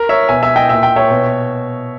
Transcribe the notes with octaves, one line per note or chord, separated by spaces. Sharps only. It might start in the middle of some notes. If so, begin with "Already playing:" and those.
Already playing: A#4
C#5 E5
B2 E5 G#5
E5 G#5
D#5 G5
A#2 E5
G5
C#5 E5
B2